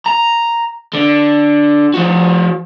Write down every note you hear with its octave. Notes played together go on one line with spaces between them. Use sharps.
A#5
D3
F3 F#4